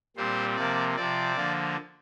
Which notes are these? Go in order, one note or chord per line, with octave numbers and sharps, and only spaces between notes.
A#2 G3 C4 C5
C3 F3 A#3 D5
C3 F3 C4 D5
D3 F3 A#3